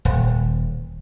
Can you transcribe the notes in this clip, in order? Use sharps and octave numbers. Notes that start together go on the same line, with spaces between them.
D#1